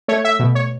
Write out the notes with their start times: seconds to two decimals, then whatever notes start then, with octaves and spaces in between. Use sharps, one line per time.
0.08 A3 C#5
0.24 E5
0.39 B2
0.55 C#5